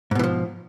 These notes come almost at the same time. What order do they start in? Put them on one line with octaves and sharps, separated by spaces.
G#2 B2 E3 F3